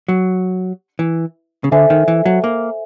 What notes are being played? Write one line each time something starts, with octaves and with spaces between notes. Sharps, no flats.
F#3
E3
C#3
D3 A4 C5 E5 G#5
D#3
E3
F#3
A#3